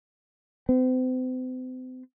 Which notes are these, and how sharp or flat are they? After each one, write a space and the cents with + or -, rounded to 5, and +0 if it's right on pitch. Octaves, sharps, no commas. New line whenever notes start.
C4 -40